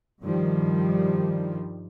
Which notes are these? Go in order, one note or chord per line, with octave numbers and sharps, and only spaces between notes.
G2 D#3 F3 G3